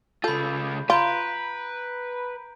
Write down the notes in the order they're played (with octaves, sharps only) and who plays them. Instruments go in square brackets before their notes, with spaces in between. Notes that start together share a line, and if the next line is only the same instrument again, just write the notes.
[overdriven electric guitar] C#3 F4 [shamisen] A4 [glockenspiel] B5 G6
[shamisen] F4 [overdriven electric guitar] B4 [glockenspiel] A#5 G6 D7